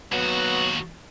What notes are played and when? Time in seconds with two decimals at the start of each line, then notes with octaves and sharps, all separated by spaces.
0.12 D#2 F#3 B3 F#4